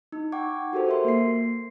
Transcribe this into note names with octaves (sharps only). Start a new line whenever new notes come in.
D#4
F#5 G5 C#6 D6 G#6
F#4 G4 A4 A#4 C5
A#4 E5 C6
A#3 C7